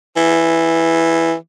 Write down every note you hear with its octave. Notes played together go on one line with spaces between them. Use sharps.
E3